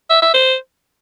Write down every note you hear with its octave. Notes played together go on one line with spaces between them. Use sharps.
E5
E5
C5